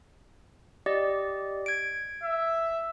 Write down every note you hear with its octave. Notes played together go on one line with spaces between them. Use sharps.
G4 D5 D#5
G#6 D7
E5